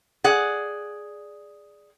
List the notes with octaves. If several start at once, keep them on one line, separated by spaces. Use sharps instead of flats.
G#4 D5 F#5